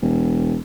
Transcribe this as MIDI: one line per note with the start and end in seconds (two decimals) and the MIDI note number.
0.02 0.57 28